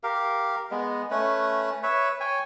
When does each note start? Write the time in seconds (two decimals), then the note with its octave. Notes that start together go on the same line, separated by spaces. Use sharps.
0.03 G4 A#4 F5
0.71 G#3 B3
1.11 A3 C#4 B4
1.83 B4 C#5 E5
2.20 C#5 G5 G#5